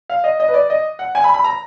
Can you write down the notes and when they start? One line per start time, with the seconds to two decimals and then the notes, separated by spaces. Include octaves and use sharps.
0.10 F5
0.24 D#5
0.40 D#5
0.48 B4
0.54 D5
0.70 D#5
0.99 F#5
1.15 G#5
1.24 B5
1.34 B5
1.44 A#5